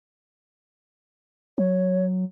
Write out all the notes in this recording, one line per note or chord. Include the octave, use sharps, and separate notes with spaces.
F#3 C#5